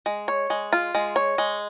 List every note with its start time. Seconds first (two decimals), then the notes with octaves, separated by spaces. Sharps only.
0.06 G#3
0.28 C#5
0.50 G#3
0.73 F4
0.95 G#3
1.16 C#5
1.38 G#3